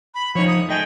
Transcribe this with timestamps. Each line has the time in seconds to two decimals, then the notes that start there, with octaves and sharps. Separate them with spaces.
0.14 B5
0.35 F3 D#4 C#5
0.47 D#6
0.69 A3 D#5 G5 G#5